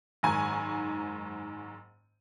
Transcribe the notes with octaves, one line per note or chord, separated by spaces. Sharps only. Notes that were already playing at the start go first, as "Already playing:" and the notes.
F#1 G#2 D#3 G#5 A#5 C#6